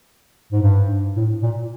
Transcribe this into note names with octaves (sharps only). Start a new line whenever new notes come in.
G#2
G2
A2
A#2